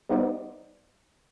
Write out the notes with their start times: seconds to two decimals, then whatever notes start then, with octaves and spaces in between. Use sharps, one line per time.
0.09 G3 B3 D#4 C5 D5 D#5